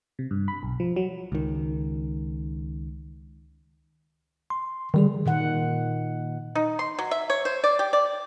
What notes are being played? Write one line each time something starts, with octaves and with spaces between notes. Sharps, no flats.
C3
G2
B5
B1
F3
F#3
C#2 D#3
C6
D3 D#3 G3 G#4
A#2 D#3 F#5
D#4
C6
F#3
E5
C#5
C5
D5
G4
D5